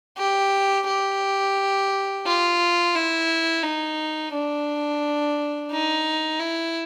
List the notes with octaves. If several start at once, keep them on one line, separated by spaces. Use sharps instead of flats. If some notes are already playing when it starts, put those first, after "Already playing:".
G4
G4
F4
E4
D#4
D4
D#4
E4